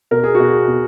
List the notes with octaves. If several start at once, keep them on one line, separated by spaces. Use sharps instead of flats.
B2 A#4
G#4
F#4
B2
G#4
B2